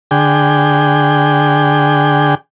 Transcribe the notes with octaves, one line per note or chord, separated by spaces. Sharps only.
D3 G#4 G5